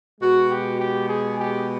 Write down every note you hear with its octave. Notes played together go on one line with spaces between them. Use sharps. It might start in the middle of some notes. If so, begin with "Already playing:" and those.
B2 G#3 F#4
G4
G4
G#4
G4